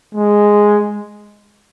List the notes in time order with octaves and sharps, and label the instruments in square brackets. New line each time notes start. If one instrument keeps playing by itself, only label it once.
[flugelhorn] G#3